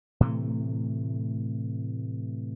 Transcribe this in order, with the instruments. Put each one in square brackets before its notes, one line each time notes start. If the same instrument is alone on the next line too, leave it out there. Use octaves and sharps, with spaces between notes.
[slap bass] A2 C3 E3 A3